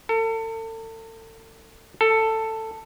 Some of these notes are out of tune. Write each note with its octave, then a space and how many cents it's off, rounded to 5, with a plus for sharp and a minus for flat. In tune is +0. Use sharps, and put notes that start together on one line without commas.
A4 +35
A4 +10